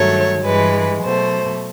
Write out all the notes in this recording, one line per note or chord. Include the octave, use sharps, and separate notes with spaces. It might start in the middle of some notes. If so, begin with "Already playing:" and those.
Already playing: G2 D#3 F#3 A3 C#5
G2 E3 G#3 B4
B2 F#3 A3 C5